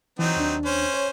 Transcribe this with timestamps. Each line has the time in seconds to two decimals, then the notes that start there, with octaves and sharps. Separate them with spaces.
0.19 E3 F#3 C4 D#4
0.36 D#2 D4
0.65 C#4 C5
0.94 C#5